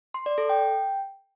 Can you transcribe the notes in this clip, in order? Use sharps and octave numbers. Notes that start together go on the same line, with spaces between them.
C6
D5
A4
G5